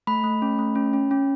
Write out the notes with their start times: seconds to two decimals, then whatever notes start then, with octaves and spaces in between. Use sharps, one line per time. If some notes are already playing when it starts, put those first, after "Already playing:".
0.07 A3 B5
0.24 A3
0.42 C#4
0.59 A3
0.75 C#4
0.93 C#4
1.11 C#4